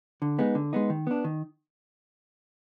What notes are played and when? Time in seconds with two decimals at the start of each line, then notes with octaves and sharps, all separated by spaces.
0.22 D3
0.39 G#3 B3 D#4
0.55 D3
0.73 G#3 B3 D#4
0.90 D#3
1.07 B3 D4
1.24 D#3